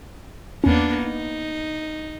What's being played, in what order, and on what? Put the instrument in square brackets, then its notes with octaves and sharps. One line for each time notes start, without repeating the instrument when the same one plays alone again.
[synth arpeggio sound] E2 C#4 [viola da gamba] A#3 B3 D4
[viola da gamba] D#4